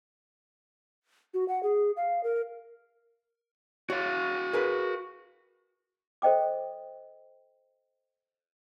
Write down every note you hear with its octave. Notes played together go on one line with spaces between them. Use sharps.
F#4
F#5
G#4
F5
A#4
F#4 C#5 F5
G#4 A#4 B4
A4 C5 D#5 G5 D6